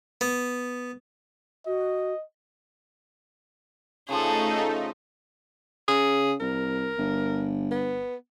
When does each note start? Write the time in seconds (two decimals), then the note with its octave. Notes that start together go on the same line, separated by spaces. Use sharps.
0.21 B3
1.67 F#4 D#5
4.09 C#3 F3 A3 D#4 G#4 A4
5.88 C#3 G#4
6.41 C2 A#4
6.98 G1
7.71 B3